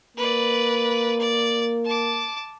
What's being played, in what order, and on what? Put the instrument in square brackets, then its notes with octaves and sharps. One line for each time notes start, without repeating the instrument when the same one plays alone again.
[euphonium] A#3 [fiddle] B4 D5
[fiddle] D5
A5 D6